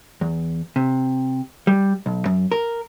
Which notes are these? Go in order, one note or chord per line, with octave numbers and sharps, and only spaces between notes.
E2
C3
G3
B1
F#2
A#4